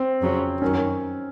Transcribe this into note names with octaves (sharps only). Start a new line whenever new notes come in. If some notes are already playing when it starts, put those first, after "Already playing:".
Already playing: C4
F2 C#3 F#3 C#4
F#2 D#3 F#3 C#4